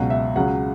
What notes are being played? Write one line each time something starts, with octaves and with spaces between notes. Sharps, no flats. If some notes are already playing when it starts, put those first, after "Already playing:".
Already playing: C#2 B2 F#3 F#5
E5
C#2 C#3 F#3 F#5